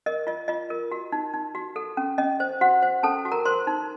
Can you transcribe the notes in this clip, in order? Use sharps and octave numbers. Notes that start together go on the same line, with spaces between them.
A#4 D#5
F4 D#5
F4 D#5
A#4
F#4
D#4
D#4
F#4
A4
C#4
C#4 D#5
C5
F#4 C5 F#5
C5
C#4 A4 A5
F#4
A#4 A#5
A#4 C5 C6
D#4